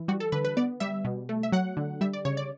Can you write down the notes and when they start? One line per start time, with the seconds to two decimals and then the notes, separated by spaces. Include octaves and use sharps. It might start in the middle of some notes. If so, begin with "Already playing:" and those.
Already playing: E3
0.08 G3 F#4
0.20 A4
0.32 D3 B4
0.45 B4
0.57 B3 D5
0.80 G3 E5
1.05 B2
1.29 A3
1.43 E5
1.52 F#3 F#5
1.77 D3
2.01 G3 E5
2.13 D5
2.25 C#3 C#5
2.37 D5